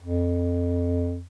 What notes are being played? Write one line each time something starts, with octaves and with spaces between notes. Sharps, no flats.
F2